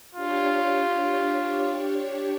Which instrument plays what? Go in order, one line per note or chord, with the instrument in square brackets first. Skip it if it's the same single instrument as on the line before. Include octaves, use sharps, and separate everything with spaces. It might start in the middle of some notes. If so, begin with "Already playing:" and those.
[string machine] D4 G4 C#5 [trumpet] F4